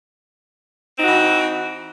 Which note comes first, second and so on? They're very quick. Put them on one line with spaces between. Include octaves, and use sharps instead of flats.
C4 D#4 F#4 E3